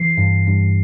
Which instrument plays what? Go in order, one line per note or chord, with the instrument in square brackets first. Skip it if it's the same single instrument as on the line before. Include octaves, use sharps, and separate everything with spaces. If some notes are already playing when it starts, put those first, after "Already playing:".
Already playing: [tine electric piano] E3 [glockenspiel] C7
[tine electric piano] G2
G2